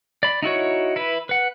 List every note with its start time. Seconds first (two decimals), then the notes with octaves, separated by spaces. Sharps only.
0.23 D5 B5
0.42 D#4 E4 F#4 C#5
0.96 E4 B4
1.29 B4 F#5